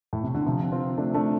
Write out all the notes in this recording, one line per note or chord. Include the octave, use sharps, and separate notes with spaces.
A2
C3
D3
C3 F3
C4 F4
A3 D4
A3 D4